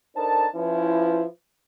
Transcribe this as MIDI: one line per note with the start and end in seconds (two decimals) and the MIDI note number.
0.16 0.47 62
0.16 0.47 63
0.16 0.47 69
0.16 0.47 70
0.16 0.47 72
0.16 0.47 81
0.55 1.24 53
0.55 1.24 61
0.55 1.24 64
0.55 1.24 71